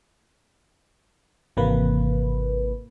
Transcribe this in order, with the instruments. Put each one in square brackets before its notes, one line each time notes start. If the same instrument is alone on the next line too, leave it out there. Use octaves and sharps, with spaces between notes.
[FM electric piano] G#1 C3 E3 A#3 B4